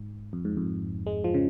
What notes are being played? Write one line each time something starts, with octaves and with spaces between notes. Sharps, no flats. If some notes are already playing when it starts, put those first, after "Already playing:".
Already playing: G#2
F2
G#2
F2
G#3
F3
C#3